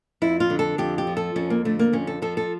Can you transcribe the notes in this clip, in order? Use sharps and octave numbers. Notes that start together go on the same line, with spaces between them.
F2 E4
F4
D3
A4
F2 G4
G4
F3
A4
F2 C#4
A#3
D3 A3
A#3
F2 C#4
A4
F3 A4
A4